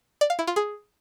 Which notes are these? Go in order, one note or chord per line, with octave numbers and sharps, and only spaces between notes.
D5
F5
E4
F4
G#4